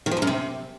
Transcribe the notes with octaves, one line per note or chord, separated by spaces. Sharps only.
D#3
F3
E2
F#2
C3